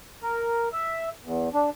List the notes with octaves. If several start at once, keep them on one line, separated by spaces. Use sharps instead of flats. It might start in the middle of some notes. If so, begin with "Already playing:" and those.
A#4
E5
E2
D4